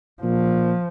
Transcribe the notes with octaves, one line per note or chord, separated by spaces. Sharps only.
A#2 F3